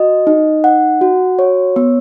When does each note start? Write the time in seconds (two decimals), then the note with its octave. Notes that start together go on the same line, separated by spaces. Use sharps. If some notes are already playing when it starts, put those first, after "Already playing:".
Already playing: F#4 D#5
0.27 D#4
0.64 F#5
1.01 F#4
1.39 C#5
1.76 B3